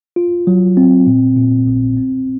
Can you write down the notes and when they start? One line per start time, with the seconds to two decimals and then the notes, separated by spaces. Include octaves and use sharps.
0.16 F4
0.47 F#3
0.77 C4
1.07 A#2
1.37 A#2
1.67 A#1
1.97 C4